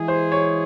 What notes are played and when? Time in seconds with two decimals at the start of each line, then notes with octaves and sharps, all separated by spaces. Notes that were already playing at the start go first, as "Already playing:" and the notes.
Already playing: E3 G#3 E4 G#4
0.08 C5
0.32 C#5